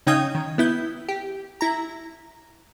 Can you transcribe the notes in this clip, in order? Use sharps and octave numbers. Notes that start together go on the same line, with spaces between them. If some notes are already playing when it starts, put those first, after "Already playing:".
C#3 C#4 D#4 G5 D#6 G#6
D#3
B3 E4 G6
G4
E4 A#5